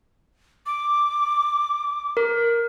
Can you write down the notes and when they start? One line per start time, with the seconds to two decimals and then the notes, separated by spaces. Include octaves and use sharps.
0.66 D6
2.17 A#4